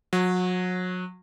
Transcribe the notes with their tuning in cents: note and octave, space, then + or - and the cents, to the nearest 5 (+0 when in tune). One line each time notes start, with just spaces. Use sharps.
F#3 -30